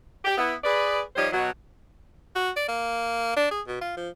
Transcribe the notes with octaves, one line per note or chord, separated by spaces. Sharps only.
G4
B3 E4
G#4 B4 D5
F3 G3 D#4 G4 C5 C#5
B2 F#3
F#4
D5
A#3
D4
G#4
B2
F4
F3